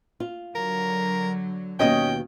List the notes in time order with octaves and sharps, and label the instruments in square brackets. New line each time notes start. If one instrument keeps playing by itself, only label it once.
[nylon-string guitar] F4
[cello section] D3 F#3 [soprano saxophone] A#4
[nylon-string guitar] D#2 B2 C#5 [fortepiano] C#4 D#5 D#6 [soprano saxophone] G5